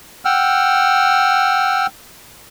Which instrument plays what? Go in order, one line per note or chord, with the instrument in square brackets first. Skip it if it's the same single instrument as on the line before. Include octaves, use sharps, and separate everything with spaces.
[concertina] F#5 G5 E6 F6